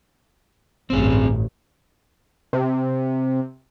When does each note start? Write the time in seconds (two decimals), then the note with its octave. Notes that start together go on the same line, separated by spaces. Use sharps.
0.90 A1 D2 G2 C4 G#4
2.53 C3